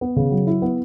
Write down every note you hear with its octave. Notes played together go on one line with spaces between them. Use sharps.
B3
C#3
F#3
E4
B3